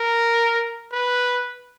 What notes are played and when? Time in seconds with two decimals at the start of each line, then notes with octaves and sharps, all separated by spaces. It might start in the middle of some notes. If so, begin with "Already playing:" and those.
Already playing: A#4
0.92 B4